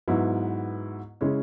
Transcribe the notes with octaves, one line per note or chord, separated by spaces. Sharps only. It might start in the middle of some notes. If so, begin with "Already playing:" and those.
G#2 F#3 B3 E4
C#3 G#3 C#4 E4